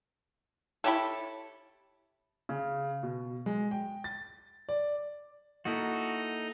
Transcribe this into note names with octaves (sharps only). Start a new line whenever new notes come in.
E4 G4 A4 C#5 B5
C#3
B2
G#3
G5
A6
D5
A#3 D#4 E4 F#4 A4